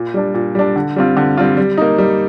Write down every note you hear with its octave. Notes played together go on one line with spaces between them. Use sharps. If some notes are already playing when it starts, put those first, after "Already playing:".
Already playing: A#2
G3 D4
A#2
G3 D4
D3
G3 C4 F4
D3
G3 C4 F4
G3
A#3 D#4
G3